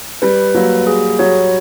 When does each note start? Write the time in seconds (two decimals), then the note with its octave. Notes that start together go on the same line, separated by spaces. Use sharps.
0.22 G3 B4
0.55 F#3 A#3
0.87 G#4
1.19 F#3 C#5